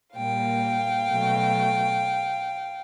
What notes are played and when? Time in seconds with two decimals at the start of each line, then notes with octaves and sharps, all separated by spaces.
0.16 A#2 G3 A#3 F5 G5
1.09 B2 F#3 A3